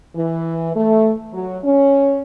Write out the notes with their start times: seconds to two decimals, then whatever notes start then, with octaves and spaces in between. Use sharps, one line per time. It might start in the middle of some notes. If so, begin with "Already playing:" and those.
0.15 E3
0.75 A3
1.33 F#3
1.64 C#4